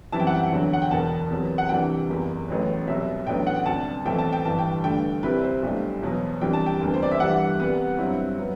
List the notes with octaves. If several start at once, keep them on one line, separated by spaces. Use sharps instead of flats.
F#2 E3 G3 C4 E4 A5
G5
F#5
G5
E2 D3 F#3
F#5
G5
E1 E2 B2 A5
E2 C3 F#3 B3
F#5
C2 C3 E3 G3 D4 G5
F#1 E2 C3
A1 A2 F#3 B3
C2 B2 F#3 E5
A1 A2 F#3 B3 D4 G5
F#5
G5
D2 C3 G3 A5
B1 A2 E3 A3 C4 G5
A5
G5
G1 G2 E3 G3 A5
G5
G2 D3 A3 G5
C2 C3 G3 C4 E4 B4
C5
B1 A2 G3 D4
E2 B2 F#3 B3
C2 C3 E3 G3 D4 G5
A5
G5
E1 D2 C3 G3 B3
C5
D5
E5
G2 E3 G3 B3 F#5
C2 C3 G3 B3
G2 F#3 C4 E4
C3 F#3 B3